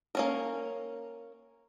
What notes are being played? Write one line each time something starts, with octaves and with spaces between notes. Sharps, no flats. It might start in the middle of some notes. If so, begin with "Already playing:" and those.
A#3 C#4 A#4